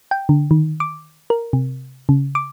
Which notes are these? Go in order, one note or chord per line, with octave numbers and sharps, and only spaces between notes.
G5
D3
D#3
D6
A#4
C3
C#3
D6